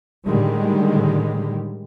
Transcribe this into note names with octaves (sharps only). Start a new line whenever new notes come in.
A2 D3 D#3 G3 G#3